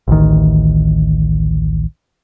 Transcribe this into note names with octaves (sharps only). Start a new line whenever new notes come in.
A1 D2 D#3